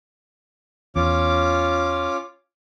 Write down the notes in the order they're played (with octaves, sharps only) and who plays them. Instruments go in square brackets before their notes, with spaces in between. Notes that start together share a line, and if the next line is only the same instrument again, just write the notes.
[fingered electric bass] E2 [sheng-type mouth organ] C#4 F4 D6